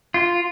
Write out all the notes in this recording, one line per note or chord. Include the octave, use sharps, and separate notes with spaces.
F4